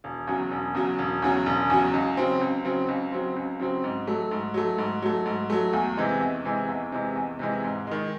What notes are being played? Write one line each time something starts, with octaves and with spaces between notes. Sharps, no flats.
E1
E2 C#3 F#3
E1
E2 C#3 F#3
E1
E2 C#3 F#3
E1
E2 C#3 F#3
C#2
C#3 F#3 C4
C#2
C#3 F#3 C4
C#2
C#3 F#3 C4
C#2
C#3 F#3 C4
G#2
F#3 A3
G#2
F#3 A3
G#2
F#3 A3
G#2
F#3 A3
E2
C3 E3 G#3
E2
C3 E3 G#3
E2
C3 E3 G#3
E2
C3 E3 G#3
G#2
D#3 G#3